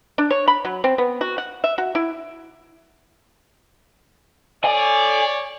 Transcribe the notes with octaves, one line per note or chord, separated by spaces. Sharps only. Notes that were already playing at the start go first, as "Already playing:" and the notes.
D4
C#5
B5
F#3
C4
B3
F#4
F#5
E5
F#4
E4
A4 C#5 D5 G#5